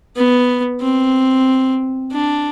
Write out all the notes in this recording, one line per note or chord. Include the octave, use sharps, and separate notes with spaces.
B3
C4
D4